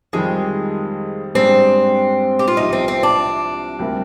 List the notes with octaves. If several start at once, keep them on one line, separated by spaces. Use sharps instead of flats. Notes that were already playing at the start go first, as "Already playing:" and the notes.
F2 D#3 G3 G#3
G#2 G3 C4 D4 G#4
G4
F4
C2 C3 F3 D#4
C4
C4
D4
D2 C3 G3 A#3